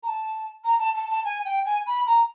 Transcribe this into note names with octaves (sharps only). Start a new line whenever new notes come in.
A#5
A5
A#5
A5
A5
A5
G#5
G5
G#5
B5
A#5